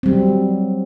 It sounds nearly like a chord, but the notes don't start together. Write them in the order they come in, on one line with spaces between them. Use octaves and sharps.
C4 G3 F#3